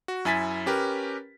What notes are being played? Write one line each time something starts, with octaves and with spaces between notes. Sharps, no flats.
F#4
F#2 E4 G#5 A6 B6
C#4 G4 A#4 B4